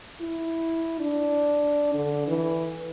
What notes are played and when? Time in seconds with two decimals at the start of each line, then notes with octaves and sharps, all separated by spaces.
0.21 E4
1.00 D4
1.94 D3
2.27 E3